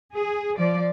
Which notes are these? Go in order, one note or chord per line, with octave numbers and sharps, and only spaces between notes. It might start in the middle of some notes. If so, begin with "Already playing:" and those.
G#4
F3 D5